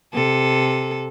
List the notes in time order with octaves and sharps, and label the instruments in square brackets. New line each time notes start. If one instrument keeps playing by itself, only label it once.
[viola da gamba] C3 A4